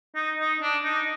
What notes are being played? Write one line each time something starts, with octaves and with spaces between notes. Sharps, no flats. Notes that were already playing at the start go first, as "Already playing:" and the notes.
D#4
D#4
D4
D#4